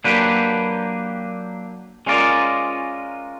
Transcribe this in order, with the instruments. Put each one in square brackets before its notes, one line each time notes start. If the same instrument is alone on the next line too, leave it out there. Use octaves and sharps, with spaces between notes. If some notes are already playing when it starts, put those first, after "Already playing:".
[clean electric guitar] F#3 A#3 D4 G4 B4
G#3 C#4 F4 A#4 D5